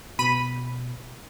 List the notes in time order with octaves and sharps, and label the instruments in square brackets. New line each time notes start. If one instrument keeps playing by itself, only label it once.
[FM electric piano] B2 [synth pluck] B5 D#7